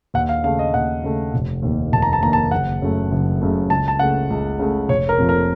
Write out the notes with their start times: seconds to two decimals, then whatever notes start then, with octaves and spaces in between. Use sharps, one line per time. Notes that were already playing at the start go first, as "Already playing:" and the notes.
0.14 D#2 F#5
0.29 F5
0.44 C#3 A3 F5
0.59 D#5
0.74 D#2 F#5
1.04 C#3 A3
1.34 F1
1.62 D#2 D#3 A#3
1.92 F1 A5
2.02 A#5
2.13 A5
2.22 D#2 D#3 A#3 A#5
2.33 A5
2.51 F#1 F#5
2.82 F#2 C#3 A3
3.12 F#1
3.41 F#2 C#3 A3
3.70 C#2 A5
3.88 A5
3.99 C#3 A3 F#5
4.30 C#2
4.59 C#3 A3
4.89 F1 C#5
5.09 A#4
5.18 F2 C3 F3 A3
5.29 A#4